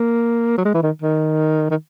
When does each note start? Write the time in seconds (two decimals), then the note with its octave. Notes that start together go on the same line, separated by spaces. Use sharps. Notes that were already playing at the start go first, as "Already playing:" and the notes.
Already playing: A#3
0.58 F#3
0.65 G#3
0.74 E3
0.83 D#3
1.02 D#3
1.71 D#3